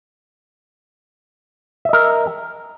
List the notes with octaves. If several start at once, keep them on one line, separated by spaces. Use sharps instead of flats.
A#4 D#5 E5